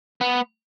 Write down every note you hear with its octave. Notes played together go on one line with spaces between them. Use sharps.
B3